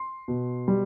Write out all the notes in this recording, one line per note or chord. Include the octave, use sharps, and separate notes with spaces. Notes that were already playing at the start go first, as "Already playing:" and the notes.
Already playing: C6
B2
G3